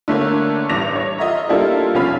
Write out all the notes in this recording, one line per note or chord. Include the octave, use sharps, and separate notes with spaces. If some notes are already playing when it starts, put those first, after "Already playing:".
D3 A3 A#3 C#5
A1 G2 D6 A#6 F7
C#5
F4 D#5 E5 A#5
G3 A#3 D4 E4 F4 A4
B1 F2 C#4 F4 F5 B5